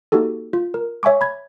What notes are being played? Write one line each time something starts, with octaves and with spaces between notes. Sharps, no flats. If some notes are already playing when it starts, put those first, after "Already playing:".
A#3 D#4 F#4 G4 A4
F4
A#4
C#5 E5 G#5 C#6 D6
B5 G#6